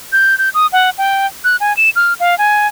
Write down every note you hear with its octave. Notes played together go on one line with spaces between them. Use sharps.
G6
G6
D#6
F#5
G5
F#6
G#5
E7
F6
F5
G#5